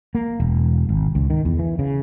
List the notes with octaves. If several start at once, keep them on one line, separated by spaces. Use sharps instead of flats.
A#3
E1
G#1
C#2
D#3
E2
E3
C#3